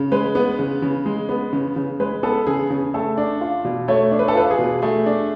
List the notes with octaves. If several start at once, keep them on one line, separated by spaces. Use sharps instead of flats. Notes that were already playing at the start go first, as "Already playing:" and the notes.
Already playing: C#3
G#3 B4
B3
C#3
C#3
G#3
B3
C#3
C#3
G#3 B4
B3 A4
C#3 G#4
C#3 G#4
A3 A4
D4
F4
B2
A3 C#5
D4
B4
A4
F4 B4
G#4
B2
A3 G#4
D4